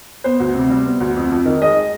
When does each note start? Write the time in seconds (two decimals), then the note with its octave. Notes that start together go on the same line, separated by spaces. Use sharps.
0.24 B3 C5
0.40 D2
0.55 C3
0.70 G3
0.86 B3
1.00 D2
1.16 F2
1.31 F2
1.45 D#3
1.61 G#3 D#5